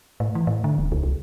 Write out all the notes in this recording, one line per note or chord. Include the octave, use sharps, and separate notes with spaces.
A2
E3
A2
D3
D#1
C#2
C2